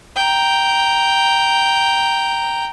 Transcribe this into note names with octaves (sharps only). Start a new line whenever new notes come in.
G5 A#5